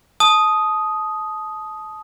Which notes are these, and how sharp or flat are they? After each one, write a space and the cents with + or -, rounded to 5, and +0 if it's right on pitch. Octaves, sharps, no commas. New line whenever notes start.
A5 -25 D#6 +0